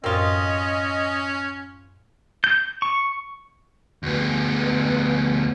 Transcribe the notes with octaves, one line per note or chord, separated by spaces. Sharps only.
F#2 A2 C4 C#4 F4 A#4 D#5
G6
C#6
D2 B3